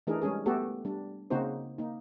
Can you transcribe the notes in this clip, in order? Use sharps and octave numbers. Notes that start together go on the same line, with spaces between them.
E3 A3 D4 D#4 G#4 A#4
G3 G#3 C#4 G#4
A3 B3 F#4 G4 A4
G3 D4
C#3 A#3 C4 D#4 F#4 C5
A#3 D#4